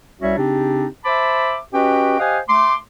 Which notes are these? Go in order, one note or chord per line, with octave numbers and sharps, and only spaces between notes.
C2 G3 C#4 F#4 C#5 E5
C#3 C4 D4 D#4 G4
C5 E5 A5 B5 D6
C#4 F#4 G4 B4 D#5 G5
G4 C5 D#5 F5 F#5 G#5
A3 C6 D6